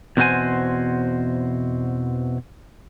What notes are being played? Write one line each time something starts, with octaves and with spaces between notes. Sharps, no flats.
E2 B2 C4 F#4 C5 G#5